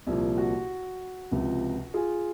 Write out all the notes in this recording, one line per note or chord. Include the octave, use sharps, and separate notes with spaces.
C2 A#2 F3 A#3
F#4
C#2 C3 F3
F4 G#4